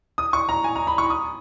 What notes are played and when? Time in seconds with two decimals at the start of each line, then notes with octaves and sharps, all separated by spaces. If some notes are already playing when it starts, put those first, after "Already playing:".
0.18 D#6
0.33 C#6
0.49 A#5
0.64 G#5
0.76 A#5
0.87 B5
0.98 C#6
1.10 D#6